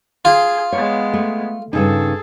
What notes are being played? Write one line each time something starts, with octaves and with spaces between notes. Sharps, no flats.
F4 G#4
G#3 B3 C#5
A3
G2 C#3 D#4 G#4 A4